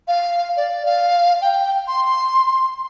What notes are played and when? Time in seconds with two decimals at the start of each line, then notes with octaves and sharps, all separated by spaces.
0.08 F5
0.57 D5
0.85 F5
1.41 G5
1.88 C6